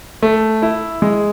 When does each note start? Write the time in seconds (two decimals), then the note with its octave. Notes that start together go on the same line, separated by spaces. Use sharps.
0.22 A3
0.62 E4
1.02 G#3